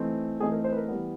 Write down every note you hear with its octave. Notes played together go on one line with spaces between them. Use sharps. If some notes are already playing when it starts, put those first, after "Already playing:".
Already playing: E3 A3 C4 D#4
E3 A3 C4 D#4 G#4
A#4
C5
B4
A#4
E3 G3 B3